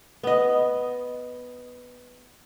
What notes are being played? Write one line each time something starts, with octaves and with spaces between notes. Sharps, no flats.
B3 D#5